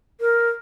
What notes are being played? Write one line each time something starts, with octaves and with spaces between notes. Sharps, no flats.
A#4